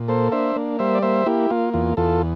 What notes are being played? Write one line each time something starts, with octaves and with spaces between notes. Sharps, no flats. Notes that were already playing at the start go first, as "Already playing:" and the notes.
Already playing: A#2
A#3 A4 C5
D4 C5 E5
A#3
G3 C5 E5
D5
A#3 C5 E5
A#3 E4 G4
A#3 F4
E2 F4
E2 F4 A4